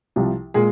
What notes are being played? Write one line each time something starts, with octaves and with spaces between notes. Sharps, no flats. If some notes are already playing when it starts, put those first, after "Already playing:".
C2 C3 F3
A#2 G#3 G#4